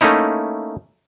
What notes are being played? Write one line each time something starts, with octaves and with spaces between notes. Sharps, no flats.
A3 A#3 C#4 D#4 E4